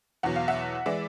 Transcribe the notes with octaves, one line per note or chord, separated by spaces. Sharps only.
E2 B2 F#3 F#5
F5
E5 F#5
E3 G#3 D5 E5